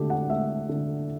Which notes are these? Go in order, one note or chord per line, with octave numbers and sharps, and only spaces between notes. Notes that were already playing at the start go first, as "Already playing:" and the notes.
Already playing: D3 A3 G4 A4
F#5
A3 E5
D3